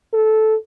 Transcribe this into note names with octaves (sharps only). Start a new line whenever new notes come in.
A4